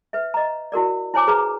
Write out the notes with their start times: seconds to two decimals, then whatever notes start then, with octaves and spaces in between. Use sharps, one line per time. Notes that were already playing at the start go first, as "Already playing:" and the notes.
0.13 B4 E5
0.34 D#5 A#5
0.72 E4 F#4 A#4 D5
1.14 E4 C5 C#5 G#5 D6
1.27 G#4 B4 A#5